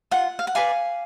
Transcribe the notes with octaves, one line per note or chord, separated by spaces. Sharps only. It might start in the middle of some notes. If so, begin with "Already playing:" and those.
F4 F#5
F5
F#5
B4 D5 F5 G#5